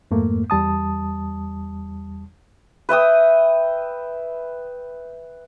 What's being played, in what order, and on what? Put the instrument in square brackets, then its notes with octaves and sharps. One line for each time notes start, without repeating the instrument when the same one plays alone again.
[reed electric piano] F2 G#2 A3 A#3
E2 G3 A5 D#6
[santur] B4 E5 G5 D#6